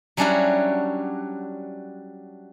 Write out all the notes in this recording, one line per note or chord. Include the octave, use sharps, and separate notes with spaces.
F#3 G3 C#4 D4 E4 F#4